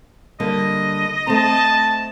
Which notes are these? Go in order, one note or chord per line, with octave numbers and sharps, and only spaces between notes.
D3 G3 A#3 D#5
A3 C4 A5